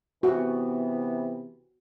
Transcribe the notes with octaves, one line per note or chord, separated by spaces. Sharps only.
C3 E3 B3 F#4